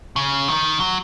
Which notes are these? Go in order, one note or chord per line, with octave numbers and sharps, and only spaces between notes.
C#3
D#3
F#3